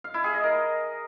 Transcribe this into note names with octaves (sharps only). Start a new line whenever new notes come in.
F5
E4
G#4
D#5
A#4